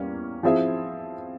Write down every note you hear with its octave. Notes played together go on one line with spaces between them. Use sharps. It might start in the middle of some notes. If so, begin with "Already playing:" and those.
Already playing: E2 G3 A#3 C#4
F3 C4 E4 G#4 E5